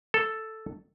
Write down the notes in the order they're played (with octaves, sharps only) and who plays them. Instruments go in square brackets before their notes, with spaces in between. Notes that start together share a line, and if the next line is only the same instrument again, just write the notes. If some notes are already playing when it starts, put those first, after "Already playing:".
[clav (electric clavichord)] A4